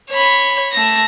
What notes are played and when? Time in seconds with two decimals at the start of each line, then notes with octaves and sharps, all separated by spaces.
0.10 C#5 B5
0.72 A3 A#6